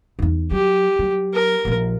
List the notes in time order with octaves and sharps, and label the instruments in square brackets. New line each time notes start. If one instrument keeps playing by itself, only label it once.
[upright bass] E2 D#4
[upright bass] F#3 [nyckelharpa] G4
[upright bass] F#3
[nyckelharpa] A#4
[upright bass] A#1 F3